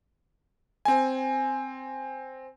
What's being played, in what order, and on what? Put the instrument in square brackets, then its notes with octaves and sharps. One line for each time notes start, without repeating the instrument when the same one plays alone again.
[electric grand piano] C4 G#5